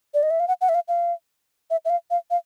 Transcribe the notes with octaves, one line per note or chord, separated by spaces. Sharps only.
D5
D#5
E5
F5
F#5
F#5
E5
F5
F5
E5
E5
F5
F5
F5